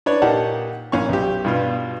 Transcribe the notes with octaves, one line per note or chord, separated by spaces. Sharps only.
D4 B4 C#5 D5
A#2 A#3 D#4 G4 F#5 A5
A#1 C#4 F5 C#6
B1 G4
G2 B2 F4